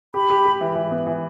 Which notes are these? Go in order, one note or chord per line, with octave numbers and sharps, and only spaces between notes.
G4 B5
G4
G4
E3
E3
B3
E3